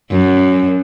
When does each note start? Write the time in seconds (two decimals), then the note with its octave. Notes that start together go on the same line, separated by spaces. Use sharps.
0.11 F#2